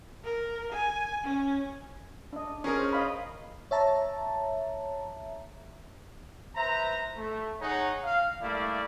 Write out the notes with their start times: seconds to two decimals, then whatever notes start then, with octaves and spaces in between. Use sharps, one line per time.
0.24 A#4
0.72 G#5
1.25 C#4
2.33 D4 D#5
2.64 C#4 G#4 A#4
2.77 C5
2.93 D#5 F5 B5
3.71 C#5 E5 A5 A#5
6.56 B4 C5 E5 A#5
7.17 A3
7.60 D#4 G#4 C#5 F#5 A#5
8.03 F5
8.42 G3 A3 A#3 E4 D5 F5